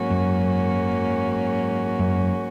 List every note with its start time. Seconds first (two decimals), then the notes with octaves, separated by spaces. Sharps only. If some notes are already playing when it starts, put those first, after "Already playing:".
Already playing: G#2 F#3 A#3 C#4 F#4
0.10 F#2
1.99 F#2